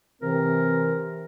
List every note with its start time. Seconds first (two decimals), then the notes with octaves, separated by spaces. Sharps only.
0.22 C3 E3 C4 A#4